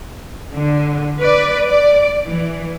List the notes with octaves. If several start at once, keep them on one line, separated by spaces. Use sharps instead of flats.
D3
B4 D5
D5
E3